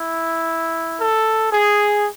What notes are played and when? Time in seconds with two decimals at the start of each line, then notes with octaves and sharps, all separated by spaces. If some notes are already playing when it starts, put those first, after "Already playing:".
Already playing: E4
0.99 A4
1.51 G#4